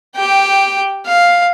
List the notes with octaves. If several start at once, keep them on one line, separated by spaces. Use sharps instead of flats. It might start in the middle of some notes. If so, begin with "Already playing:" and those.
G4 G5
F5